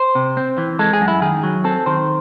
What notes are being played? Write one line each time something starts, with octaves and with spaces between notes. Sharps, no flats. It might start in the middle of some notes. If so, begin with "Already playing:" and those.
Already playing: C5
C3
C4
E3
G#3 A4
G#4
F#2
E4
D#3 G#4
F#3
C4 A4
D#3 C5